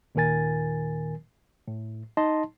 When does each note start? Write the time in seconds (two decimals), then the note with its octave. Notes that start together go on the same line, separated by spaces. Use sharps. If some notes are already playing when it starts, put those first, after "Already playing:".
0.15 D#2 A#2 D#3 A#4 G#5 A6
1.68 A2
2.17 D#4 D#5 A5 C6